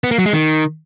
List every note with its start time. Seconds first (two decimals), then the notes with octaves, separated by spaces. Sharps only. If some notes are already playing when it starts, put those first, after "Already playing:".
0.04 B3
0.11 A#3
0.18 F#3
0.26 G#3
0.33 D#3